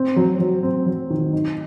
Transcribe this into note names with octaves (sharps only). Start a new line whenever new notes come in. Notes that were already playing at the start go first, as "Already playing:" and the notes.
Already playing: C4
F#3
F#3
C4
F#3
D#3
D#4